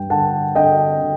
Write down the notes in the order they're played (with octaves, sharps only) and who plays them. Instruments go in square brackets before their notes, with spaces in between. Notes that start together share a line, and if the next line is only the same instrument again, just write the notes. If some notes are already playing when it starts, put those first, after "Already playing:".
Already playing: [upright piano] G2 G5
D3 F#5 A5
D3 D#5 G5
D3